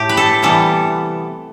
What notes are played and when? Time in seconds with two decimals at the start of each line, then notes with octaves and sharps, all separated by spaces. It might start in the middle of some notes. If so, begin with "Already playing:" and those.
Already playing: A2 A3 G4
0.09 B4
0.17 A4
0.43 C3 E3 G3 B3 A4